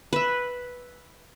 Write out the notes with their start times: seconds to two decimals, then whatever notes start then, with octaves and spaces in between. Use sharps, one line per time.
0.13 B4 E5